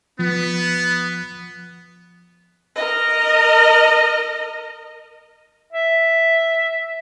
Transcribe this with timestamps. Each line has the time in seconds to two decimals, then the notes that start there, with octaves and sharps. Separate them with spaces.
0.19 F3 B3
2.76 A#4 D#5
5.72 E5